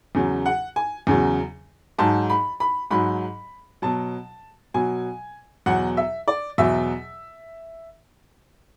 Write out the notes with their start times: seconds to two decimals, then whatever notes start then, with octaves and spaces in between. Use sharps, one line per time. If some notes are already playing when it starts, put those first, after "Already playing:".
0.15 E2 C#3 F#3
0.46 F#5
0.76 G#5
1.07 E2 C#3 F#3
1.98 G#2 F#3 A5
2.30 B5
2.60 B5
2.91 G#2 F#3 B5
3.82 B2 F#3 A5
4.74 B2 F#3 G#5
5.66 E2 B2 F#3 F#5
5.97 E5
6.28 D5
6.58 E2 B2 F#3 E5